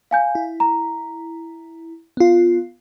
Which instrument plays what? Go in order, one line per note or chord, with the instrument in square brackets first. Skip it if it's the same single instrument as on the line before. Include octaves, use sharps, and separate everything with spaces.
[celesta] F5 G#5 G6
[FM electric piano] E4
[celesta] A#5
[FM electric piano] B3 F4